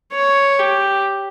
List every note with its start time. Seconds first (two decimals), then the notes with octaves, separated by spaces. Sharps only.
0.13 C#5
0.59 G4